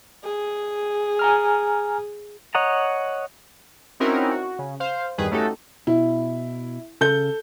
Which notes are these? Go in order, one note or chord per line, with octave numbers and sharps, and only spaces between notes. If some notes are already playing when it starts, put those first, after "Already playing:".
G#4
G#5 A#5 F6
C#5 D#5 F#5 A#5
C4 C#4 D#4 E4 F#4 A#4
F#4
C#3
C5 F5
E2 G2 D#3 G3 G#4 B4
A3 C#4 D#4 F#4 G4 A4
B2 E4
C#3 A4 G6 G7